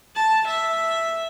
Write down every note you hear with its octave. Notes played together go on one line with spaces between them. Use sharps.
A5
E5